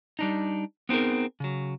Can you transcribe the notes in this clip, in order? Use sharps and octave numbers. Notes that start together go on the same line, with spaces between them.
G3 D4 D#4
B3 C4 D#4 G#4 A#4
C#3 F#3